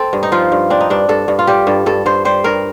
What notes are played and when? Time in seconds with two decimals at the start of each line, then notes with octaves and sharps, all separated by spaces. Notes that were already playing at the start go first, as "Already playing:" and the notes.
Already playing: C4 A4
0.13 G2
0.23 D#4
0.32 F3 F4
0.52 G2
0.70 C4 D4
0.81 D#4
0.90 G2 D4
1.09 G2 A4
1.28 G2
1.39 F4
1.47 G3 G4
1.67 G2 A4
1.86 G2 A4
2.06 G2 C5
2.25 G3 C5
2.44 G2 A#4